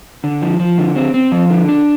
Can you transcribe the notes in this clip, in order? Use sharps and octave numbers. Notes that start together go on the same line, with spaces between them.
D3
F3
F3
D3
C4
C4
F3
D3
D4